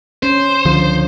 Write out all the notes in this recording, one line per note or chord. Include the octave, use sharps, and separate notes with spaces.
C#4 C5
C#2 D3 F3